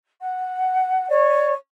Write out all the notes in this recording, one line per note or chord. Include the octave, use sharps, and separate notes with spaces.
F#5
C#5 D5